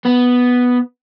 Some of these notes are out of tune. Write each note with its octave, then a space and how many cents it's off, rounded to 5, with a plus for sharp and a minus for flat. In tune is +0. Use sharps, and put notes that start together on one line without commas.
B3 +0